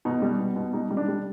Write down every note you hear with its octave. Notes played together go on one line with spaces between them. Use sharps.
B2 D#4
G3
B2
B2
G3 D#4
G3
D4
G3